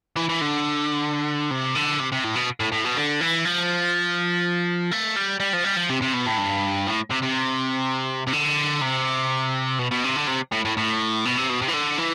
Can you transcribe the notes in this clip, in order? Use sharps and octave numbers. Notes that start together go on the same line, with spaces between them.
E3
E3
D3
C3
D3
C3
C3
A2
B2
A2
A2
B2
D3
E3
F3
A3
G3
G3
F3
G3
F3
C3
C3
B2
A2
G2
A2
C3
C3
C3
D3
C3
B2
B2
C3
D3
C3
A2
A2
A2
B2
C3
B2
C3
E3
D3
E3